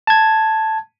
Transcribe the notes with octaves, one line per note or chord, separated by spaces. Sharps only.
A5 G#6